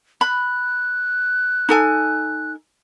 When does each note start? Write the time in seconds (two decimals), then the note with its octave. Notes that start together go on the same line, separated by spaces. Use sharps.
0.21 B5 F#6
1.69 D#4 A4 G#5